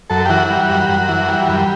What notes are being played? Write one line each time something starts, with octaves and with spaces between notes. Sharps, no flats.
F#2 A4
G4
E3 F#4
G3
F#2
F#2
E3
G3
F#2